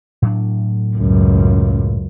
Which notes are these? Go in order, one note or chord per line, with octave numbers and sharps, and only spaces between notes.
A2 F#3 D4
C#2 F#2